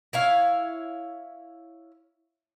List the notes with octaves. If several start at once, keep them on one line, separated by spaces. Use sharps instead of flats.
E4 C#5 F5